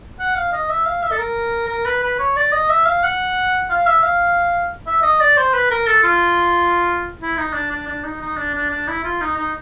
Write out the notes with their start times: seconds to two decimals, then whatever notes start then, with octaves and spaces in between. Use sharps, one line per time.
0.19 F#5
0.35 F5
0.53 D#5
0.69 E5
0.86 F5
1.03 E5
1.11 A4
1.18 A#4
1.68 A#4
1.85 B4
2.03 B4
2.19 C#5
2.36 D5
2.52 D#5
2.69 E5
2.86 F5
3.03 F#5
3.70 F5
3.87 E5
4.03 F5
4.87 E5
5.02 D#5
5.20 D5
5.37 C5
5.54 B4
5.70 A#4
5.87 A4
6.03 F4
7.21 E4
7.37 D#4
7.53 D4
7.71 D4
7.87 D4
8.04 D#4
8.21 D#4
8.37 D4
8.54 D4
8.70 D4
8.88 E4
9.04 F4
9.21 D#4
9.37 D#4